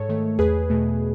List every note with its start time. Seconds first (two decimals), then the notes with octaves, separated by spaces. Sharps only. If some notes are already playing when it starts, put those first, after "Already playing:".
Already playing: G#2 A4 C#5
0.09 D#3 A3
0.39 E2 G#4 B4
0.70 B2 A3